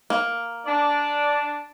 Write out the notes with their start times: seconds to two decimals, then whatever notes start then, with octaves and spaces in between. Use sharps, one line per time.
0.10 A#3
0.66 D4 D5